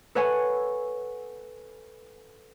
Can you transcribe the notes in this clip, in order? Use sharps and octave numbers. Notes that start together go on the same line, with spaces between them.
A4 B4 C#5 F#5 G#5 C#6